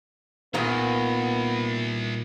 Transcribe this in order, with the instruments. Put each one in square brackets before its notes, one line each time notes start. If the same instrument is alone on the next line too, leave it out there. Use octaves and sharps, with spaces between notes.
[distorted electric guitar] C2 [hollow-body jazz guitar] A#2 D#3 A#3 [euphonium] B3